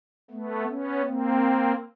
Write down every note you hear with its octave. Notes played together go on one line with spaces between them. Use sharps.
A3 B3
B3 C#4
A#3 C4